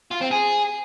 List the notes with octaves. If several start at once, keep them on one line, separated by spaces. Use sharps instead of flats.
F4
C4
G#4